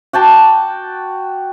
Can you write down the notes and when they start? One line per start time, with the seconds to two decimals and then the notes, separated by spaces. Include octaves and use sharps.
0.13 F#4 G5 A5 D6